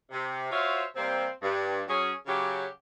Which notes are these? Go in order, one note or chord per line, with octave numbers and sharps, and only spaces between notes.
C3
F4 F#4 C5 C#5 E5 F5
C3 G3 A#3 C4
G2
F#3 C#4 G#4
C#3 F#3 G4